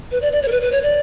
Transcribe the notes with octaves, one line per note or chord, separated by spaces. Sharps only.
B4
D5
D5
C#5
A#4
B4
B4
C#5
D5